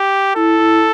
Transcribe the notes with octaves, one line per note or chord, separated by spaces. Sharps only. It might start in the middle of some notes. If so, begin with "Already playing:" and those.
Already playing: G4
E4 A4
E4